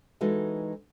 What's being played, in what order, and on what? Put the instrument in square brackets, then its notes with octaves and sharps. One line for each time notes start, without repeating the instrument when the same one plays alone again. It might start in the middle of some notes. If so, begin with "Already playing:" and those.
[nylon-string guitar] E3 G#3 D#4 F#4 A4 D#5